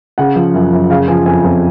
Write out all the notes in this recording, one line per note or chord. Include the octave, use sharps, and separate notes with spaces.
C#3 F#5
F3
F#2
F#2
C#3 F5
F3 G#5
F2 G#5
F2